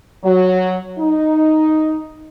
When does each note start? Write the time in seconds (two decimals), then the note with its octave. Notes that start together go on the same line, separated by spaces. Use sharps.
0.24 F#3
0.99 D#4